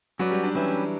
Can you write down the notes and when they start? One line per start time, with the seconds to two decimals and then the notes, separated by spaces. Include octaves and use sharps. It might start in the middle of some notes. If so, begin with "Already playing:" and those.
0.19 F#3 C#4 F#4 B4 D5
0.31 G3
0.43 D4
0.55 E3 C#4 G4 B4 E5